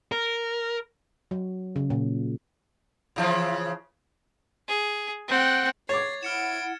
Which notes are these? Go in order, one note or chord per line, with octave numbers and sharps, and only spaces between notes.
A#4
F#3
C#3
A#2
C#3 E3 F3
G#4
C4 F#5 G5
C#5 D6 G#6 A6 C7
E4 F#5 F6 G#6 C#7 D7 E7